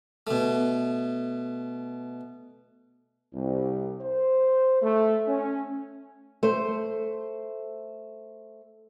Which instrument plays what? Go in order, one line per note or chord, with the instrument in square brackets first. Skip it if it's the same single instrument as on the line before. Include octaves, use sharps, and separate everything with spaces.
[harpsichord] B2 A3
[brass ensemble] C2
C5
A3
C#4
[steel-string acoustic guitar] A3 C5